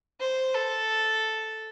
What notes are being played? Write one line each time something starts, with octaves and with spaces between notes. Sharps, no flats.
C5
A4